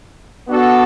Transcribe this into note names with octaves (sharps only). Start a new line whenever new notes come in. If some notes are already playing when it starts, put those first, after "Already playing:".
B3 D4 F#4 A4